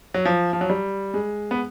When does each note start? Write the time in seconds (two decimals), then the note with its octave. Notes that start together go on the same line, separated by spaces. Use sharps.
0.14 F#3
0.25 F3
0.53 F3
0.61 F#3
0.70 G3
1.14 G#3
1.51 B3